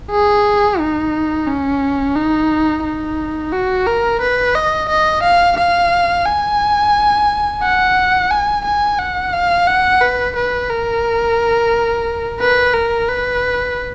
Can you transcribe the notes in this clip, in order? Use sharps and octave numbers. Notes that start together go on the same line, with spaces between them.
G#4
D#4
C#4
D#4
D#4
F#4
A#4
B4
D#5
D#5
F5
F5
G#5
F#5
G#5
G#5
F#5
F5
F#5
B4
B4
A#4
B4
A#4
B4